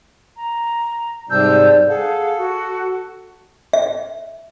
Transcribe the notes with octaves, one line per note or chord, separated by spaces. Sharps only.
A#5
G#2 C3 G3 A5 E6 G6
G#4 A4 F5 F#5
F#4
E5